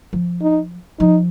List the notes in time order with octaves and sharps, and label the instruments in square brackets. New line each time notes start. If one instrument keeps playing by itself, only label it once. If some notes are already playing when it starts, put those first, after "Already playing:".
[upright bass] F3
[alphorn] D#4
[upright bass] F3 [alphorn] D#4